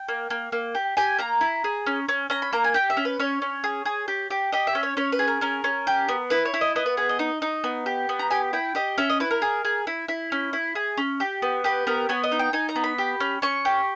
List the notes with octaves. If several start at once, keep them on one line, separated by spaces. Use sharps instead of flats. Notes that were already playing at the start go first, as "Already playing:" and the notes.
Already playing: G5
A#3
A#3
A#3
G4
G4 G#5
A#3 A#5
E4
G#4
C#4
C#4
C#4 A#5
B5
A#3 A#5
G#5
G4 G5
E5
C#4
B4
C#4 C#5
C#4
G#4
G#4
G4
G4
G4 D#5
E5
C#4
C#5
C#4 C#5
B4
G#4
A#4
C#4 A#4
C#4
G4
B3
E4 B4
C#5
E4
D#5
B3 D#5
B4
G#4 B4
D#5
D#4
D#4
B3
G4
B3
A#5
G4 G#5
E4 G5
G4 D#5
C#4 E5
D#5
E4 B4
A#4
G#4
G#4
E4
E4
C#4
E4
G#4
C#4
G4
B3
G4 B4
B3 A#4
B3 C#5
D#5
D#4
G5
D#4 G#5
A#5
B3
B5
G4
C#4
C#4 C#6
G4